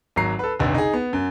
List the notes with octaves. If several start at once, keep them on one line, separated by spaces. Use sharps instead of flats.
G#1 F#3 A#5 C7
A4 B4
F1 B1 D3
D#4 G#4
B3
F#2